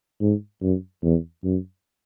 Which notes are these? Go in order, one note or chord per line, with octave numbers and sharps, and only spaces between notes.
G#2
F#2
E2
F#2